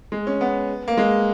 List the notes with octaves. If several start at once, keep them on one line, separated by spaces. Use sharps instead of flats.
G#3
C#4
B3
A#3
G#3